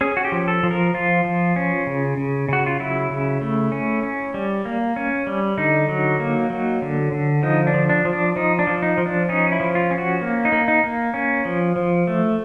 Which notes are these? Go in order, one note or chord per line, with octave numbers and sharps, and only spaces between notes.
C#4 G#4
F#4
G4
F3
A4
F3
A#4
F3 F4
F3
C#4
C#3
C#3
C#3 F#4
F4
F#3 E4
C#3
A3
C#4
C#4
G3
A#3
C#4
G3
D3 D#4
F#3
A#3
F#3
D3
D3
F3 D#4
D4
F3
D4
F3
D4
F3 D#4
D4
F3
D#4
F3
D4
C#4 D#4
E4
F3
F4
C#4
F#4
A#3
D#4
A#3
D#4
A#3
C#4
F3
F3
A3